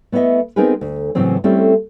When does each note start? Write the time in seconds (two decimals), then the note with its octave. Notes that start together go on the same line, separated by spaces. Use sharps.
0.12 A3 B3 E4 C#5 D#5 E5
0.56 B3 C4 D#4 G#4 A#4 B4
0.81 D2
1.15 A2 C#3 E3 F#3 C4 C#4
1.44 G3 A3 C4 C#4 E4 A4